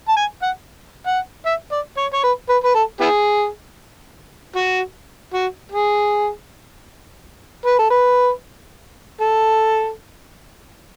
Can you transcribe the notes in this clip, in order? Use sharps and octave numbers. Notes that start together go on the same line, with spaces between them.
A5
G#5
F#5
F#5
E5
D5
C#5
C#5
B4
B4
B4
A4
B3 E4 G#4
F#4
F#4
G#4
B4
A4
B4
A4